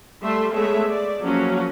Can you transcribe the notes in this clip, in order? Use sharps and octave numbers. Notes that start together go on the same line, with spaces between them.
G3 A3 E5 C6
G#3 A3 B3 G#4 C#5 E5
D5
F3 F#3 A#3 C#4 F#4